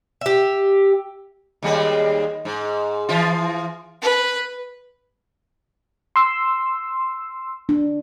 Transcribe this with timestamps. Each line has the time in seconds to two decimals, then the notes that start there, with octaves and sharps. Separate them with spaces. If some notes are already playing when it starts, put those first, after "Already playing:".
0.21 G4 E5
1.63 D#2 G3 G#3
2.45 G#2
3.09 E3 F3 F4
4.02 B4
6.16 C6 E6
7.69 D4